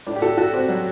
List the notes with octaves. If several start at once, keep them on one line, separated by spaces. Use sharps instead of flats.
A2 D4
G4
F#4 A4
F#4 A4
C4 G4
F#3